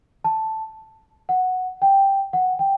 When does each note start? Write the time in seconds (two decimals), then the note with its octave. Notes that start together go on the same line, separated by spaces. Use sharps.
0.24 A5
1.29 F#5
1.82 G5
2.33 F#5
2.59 G5